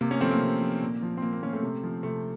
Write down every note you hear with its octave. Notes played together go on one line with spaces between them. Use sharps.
C3 A#3
A#3 C#4
F3 A3 C4
A#3
C3
F3
A#2
F3
C4
A#2 A#3
A#3
F3 A#3 C#4
A3 C4
C3
F3
C3 A3